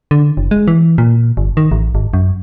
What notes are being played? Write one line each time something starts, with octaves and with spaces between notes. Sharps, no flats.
D3
F#1
G#3
E3
A#2
G1
D#3
A1
G#1
F#2